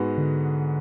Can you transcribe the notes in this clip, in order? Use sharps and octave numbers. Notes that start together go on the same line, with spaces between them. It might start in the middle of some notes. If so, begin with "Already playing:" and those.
Already playing: G#2 G#3 B3 F#4
D3